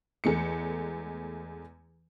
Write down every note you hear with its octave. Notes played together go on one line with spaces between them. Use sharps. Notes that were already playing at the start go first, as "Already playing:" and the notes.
E2 G#3 A3 C#7